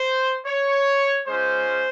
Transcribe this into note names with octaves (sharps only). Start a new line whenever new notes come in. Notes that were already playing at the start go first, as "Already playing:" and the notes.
Already playing: C5
C#5
G#3 C#4 F4 C5